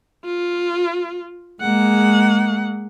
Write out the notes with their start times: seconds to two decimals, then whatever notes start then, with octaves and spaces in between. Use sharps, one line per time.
0.24 F4
1.61 G#3 A#3 F#5